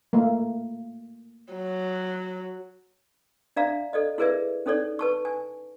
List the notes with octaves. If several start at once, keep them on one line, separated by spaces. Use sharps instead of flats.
A3 A#3
F#3
D4 D5 E5 F5 A#5
A4 D5 D#5
E4 G#4 A#4 B4 D5 E5
C#4 D#4 A4 C#5 D5
B4 A5 C#6
G#5